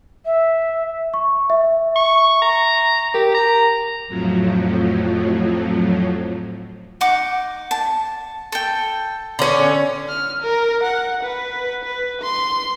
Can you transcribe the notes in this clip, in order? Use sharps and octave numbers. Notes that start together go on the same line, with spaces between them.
E5
C#6
E5
C#6
A#5
G4 A#4
A#5
F2 A2 F3 F#3
D#4 F#5 D6
A5
A4 G5
D3 C#4
F6
A#4
F#5
B4
B4
C6